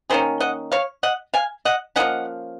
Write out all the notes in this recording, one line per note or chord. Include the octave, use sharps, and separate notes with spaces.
D#3 A#3 C#4 G#4 C5
D#5 F#5
C#5 F5
D#5 F#5
F5 G#5
D#5 F#5
F3 A#3 C#4 D#5 F#5